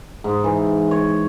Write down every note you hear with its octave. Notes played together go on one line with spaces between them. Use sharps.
G#2
E3
C#5